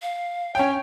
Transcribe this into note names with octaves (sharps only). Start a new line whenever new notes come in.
F5
C#4 C#5 G5